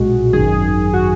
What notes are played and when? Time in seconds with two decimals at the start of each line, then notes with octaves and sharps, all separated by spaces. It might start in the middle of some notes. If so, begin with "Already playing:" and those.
Already playing: B1 A#2 G#3 F#4
0.33 G#1 F#2 D#3 G#4
0.93 F#4